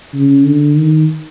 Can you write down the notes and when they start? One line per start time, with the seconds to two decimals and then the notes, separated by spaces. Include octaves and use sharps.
0.14 C#3
0.46 D3
0.77 D#3